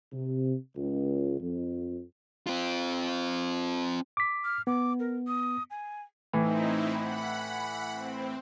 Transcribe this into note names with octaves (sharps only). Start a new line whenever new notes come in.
C3
C#2
F2
C4 F4
D6 B6
F6
B3 D6
A#4
D#6
G#5
A2 E3 C4 D#4 E4
F#5 B5
C4